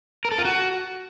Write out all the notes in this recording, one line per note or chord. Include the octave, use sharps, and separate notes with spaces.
A#4
A4
F4
F#4